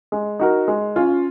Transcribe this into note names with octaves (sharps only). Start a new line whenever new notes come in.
G#3
D#4 F#4 A#4
G#3
C#4 F4